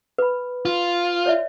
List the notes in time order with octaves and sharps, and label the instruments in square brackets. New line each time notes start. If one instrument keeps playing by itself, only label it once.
[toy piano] B4 B5
[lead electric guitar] F4
[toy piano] C#5 D5 E5